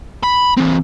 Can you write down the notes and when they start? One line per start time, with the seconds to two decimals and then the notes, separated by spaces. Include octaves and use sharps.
0.24 B5
0.58 E3 C4